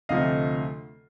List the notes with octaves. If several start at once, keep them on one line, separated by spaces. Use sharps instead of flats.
D2 C3 F3 A3 D#5 F5